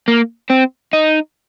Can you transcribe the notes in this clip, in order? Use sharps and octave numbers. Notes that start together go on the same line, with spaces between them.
A#3
C4
D#4